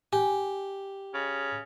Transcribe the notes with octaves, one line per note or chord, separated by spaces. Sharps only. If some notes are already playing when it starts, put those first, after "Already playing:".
G4 G#5
C#3